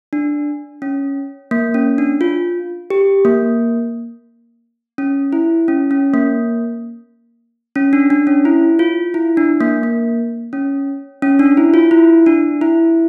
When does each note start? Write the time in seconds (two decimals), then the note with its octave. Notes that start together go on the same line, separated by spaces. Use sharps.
0.13 D4
0.82 C#4
1.51 A#3
1.74 C#4
1.98 D4
2.21 F4
2.90 G4
3.25 A#3
4.98 C#4
5.33 E4
5.68 C#4
5.91 C#4
6.14 A#3
7.76 C#4
7.93 D4
8.10 D4
8.27 C#4
8.45 E4
8.79 F4
9.14 E4
9.37 D4
9.61 A#3
9.83 A#3
10.53 C#4
11.22 C#4
11.39 D4
11.57 E4
11.74 F4
11.91 E4
12.26 D4
12.61 E4